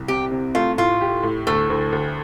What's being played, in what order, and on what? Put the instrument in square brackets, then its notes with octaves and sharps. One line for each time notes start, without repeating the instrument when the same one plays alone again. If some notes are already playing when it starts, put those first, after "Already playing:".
Already playing: [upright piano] C2
[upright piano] C3 [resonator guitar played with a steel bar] G4
[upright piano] C3
[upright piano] A3 [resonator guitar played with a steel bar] F4
[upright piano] A2 [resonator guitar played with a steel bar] F4
[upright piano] G4
A2
[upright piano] D2 [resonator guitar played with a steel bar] A3
[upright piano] D2
D2